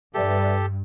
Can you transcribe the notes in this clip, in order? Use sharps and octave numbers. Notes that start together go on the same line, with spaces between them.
G2 G4 A4 B4 D5 E5